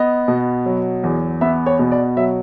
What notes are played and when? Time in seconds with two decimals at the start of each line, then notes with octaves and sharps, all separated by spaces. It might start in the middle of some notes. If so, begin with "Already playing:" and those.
Already playing: B3 D#5
0.28 B2
0.66 F#3
1.04 E2
1.41 B3 E5
1.66 C#5
1.79 B2
1.92 D5
2.17 F#3 E5